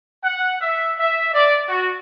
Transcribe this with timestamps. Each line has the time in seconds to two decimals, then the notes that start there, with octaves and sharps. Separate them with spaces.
0.24 F#5
0.61 E5
0.99 E5
1.33 D5
1.68 F#4